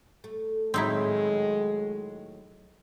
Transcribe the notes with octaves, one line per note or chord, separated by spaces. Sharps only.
A3
A2 D#3 F#3 G#3 C4 D#4 E4